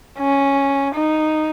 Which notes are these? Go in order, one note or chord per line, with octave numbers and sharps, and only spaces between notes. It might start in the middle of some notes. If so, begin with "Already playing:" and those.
C#4
D#4